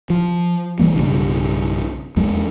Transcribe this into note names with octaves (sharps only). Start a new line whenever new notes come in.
F3
E1 E3 G3 A#3
B1 G2 C#3
E2 F#3 G#3